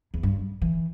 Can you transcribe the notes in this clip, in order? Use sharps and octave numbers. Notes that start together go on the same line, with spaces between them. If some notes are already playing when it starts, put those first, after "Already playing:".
E2
G2
E3